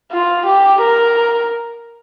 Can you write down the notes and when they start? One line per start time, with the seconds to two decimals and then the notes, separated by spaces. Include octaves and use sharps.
0.12 F4
0.46 G4
0.81 A#4